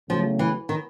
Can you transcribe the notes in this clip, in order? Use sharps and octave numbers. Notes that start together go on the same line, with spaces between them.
E2 C#3 F3 F#3 A3
E3
D#3